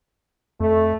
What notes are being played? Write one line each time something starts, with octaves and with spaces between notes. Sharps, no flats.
F2 A3